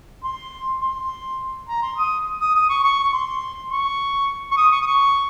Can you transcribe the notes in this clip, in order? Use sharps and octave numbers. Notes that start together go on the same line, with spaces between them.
C6
C6
A#5
C6
D#6
D#6
D#6
C#6
C#6
C#6
C6
C#6
C#6
D#6
C#6
D#6
C#6